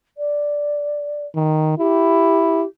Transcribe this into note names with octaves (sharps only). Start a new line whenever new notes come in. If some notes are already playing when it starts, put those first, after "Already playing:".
D5
D#3
E4 G4